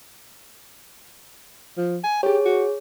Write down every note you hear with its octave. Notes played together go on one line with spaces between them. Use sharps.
F3
G#5
G4 G#4 C#5
F#4